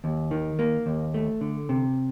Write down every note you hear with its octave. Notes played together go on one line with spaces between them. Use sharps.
D#2
D#3
A#3
D#2
A3
D3
C3